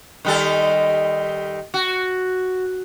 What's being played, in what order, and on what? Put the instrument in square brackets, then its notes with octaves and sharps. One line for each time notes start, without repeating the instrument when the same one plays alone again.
[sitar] D#3 G3 A4
F#4